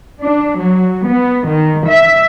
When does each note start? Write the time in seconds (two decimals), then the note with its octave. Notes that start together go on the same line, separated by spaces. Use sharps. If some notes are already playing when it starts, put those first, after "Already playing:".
0.22 D4
0.58 F#3
1.08 B3
1.49 D#3
1.88 E5